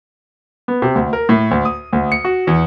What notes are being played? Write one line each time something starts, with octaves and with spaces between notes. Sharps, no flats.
B3
C3
D2
A#4
A2
D2
D#6
D2
C#7
F#4
E2